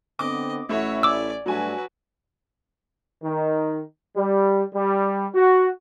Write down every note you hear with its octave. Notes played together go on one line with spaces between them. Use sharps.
D3 B3 C4 D#5 D6
A1 A3 E4 F#4 C#5
D5 G#5 D6 E6
G2 F#3 A3 D4 F#4 B4 G#5
D#3
G3
G3
F#4